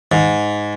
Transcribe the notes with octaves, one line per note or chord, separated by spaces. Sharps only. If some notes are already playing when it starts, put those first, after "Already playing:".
G#2